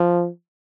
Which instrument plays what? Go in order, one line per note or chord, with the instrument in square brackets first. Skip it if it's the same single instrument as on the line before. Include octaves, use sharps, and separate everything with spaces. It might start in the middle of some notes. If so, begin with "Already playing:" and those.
Already playing: [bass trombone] F3